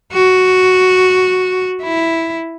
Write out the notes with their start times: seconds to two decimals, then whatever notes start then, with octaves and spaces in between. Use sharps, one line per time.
0.13 F#4
1.83 E4